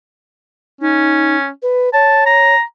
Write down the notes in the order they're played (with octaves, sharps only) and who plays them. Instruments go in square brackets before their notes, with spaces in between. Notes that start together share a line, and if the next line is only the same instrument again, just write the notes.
[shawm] C#4 [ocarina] D#4
[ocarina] B4
[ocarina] C#5 [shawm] A5
[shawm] A#5